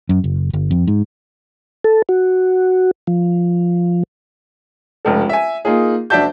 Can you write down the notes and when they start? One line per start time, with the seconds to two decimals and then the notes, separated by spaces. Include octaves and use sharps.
0.09 F#2
0.24 F#1
0.53 G1
0.71 F2
0.87 G#2
1.84 A4
2.09 F#4
3.07 F3
5.05 F1 C#2 A4
5.29 E5 G#5
5.65 A#3 D#4 F4 G#4
6.10 F#1 D4 F#4 E5 A5 G6